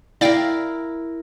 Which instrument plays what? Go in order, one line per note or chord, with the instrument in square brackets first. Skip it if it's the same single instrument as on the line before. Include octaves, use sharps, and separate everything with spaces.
[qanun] E4 A#4 [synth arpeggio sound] D5 F5 G5